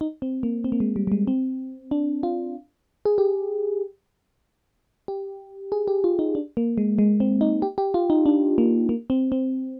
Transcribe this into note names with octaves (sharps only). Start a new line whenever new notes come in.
D#4
C4
A#3
C4
A#3
G#3
G3
G3
G#3
C4
D4
F4
G#4
G4
G4
G#4
G4
F4
D#4
D4
A#3
G#3
G#3
C4
D#4
G4
G4
F4
D#4
D4
A#3
A#3
C4
C4